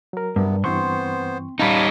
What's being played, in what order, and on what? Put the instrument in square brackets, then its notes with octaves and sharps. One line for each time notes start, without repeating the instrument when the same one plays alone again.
[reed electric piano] F#3 A#4
[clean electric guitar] G2 [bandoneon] C3 B3
[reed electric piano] G2 E3 C#6 [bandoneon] B3 C5 [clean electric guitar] C4 C6
[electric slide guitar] G3 D#4 [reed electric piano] C#4 B5 [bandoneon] C#5 F5 A5